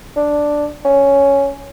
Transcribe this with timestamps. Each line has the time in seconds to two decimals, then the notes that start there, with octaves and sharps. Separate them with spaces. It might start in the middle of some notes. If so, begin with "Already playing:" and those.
0.17 D4
0.85 C#4